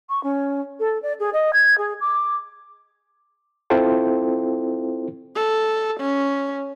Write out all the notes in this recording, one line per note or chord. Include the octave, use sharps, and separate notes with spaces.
C#6
C#4
A4
D5
G#4
D#5
G#6
G#4
D6
C4 E4 F4 A4 C5 G5
A4
C#4